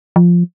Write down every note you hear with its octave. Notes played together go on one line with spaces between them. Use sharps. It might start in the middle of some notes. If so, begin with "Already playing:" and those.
F3